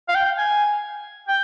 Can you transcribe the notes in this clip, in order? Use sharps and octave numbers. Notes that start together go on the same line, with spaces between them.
F5
G5
G#5
G5